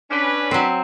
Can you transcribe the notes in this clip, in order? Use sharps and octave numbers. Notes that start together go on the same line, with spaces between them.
C#4 D4 B4
F#3 C4